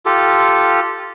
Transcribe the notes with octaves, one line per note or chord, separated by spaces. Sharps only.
F4 G4 A4